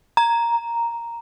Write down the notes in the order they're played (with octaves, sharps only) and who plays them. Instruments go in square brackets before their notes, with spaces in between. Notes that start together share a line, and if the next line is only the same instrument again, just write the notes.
[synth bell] A#5